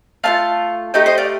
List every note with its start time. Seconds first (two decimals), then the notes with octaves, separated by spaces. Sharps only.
0.23 A3 D4 F4 F5 A5
0.94 A3 D#4 G4 D#5 G5
1.06 C5 D#5
1.18 D5 F5